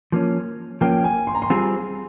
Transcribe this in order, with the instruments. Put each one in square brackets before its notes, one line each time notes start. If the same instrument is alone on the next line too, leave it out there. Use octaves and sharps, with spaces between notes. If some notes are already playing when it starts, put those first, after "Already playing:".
[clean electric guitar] F3 A#3 C#4
[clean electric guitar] F3 A#3 C#4 [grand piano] G5
[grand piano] G#5
C6
A#5
C6
[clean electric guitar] G3 C4 F4 G#4